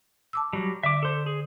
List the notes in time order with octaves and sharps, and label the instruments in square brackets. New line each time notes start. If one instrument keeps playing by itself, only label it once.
[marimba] A5 D6 E6
[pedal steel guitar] F#3 G3
[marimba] D3 [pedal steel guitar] E5 D6
[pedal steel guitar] A4 C5
G#4